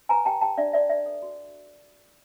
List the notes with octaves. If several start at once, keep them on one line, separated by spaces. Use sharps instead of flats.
B4 G#5 A#5
G4 G5 A5
G4 G5 A5
D4 D5 E5
G4 D5 E5
B4 D5 E5
A4
F#4